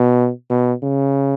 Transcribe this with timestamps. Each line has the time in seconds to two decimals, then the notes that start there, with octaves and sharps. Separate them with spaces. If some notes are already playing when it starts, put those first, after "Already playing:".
Already playing: B2
0.50 B2
0.83 C#3